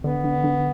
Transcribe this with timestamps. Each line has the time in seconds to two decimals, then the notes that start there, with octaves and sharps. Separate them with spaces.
0.03 D3 B3
0.24 D3
0.44 D3